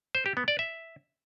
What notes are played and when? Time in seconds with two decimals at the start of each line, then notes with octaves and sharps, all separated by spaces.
0.15 C5
0.26 G4
0.37 B3
0.48 D5
0.59 E5